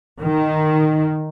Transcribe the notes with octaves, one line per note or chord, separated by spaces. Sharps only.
D#3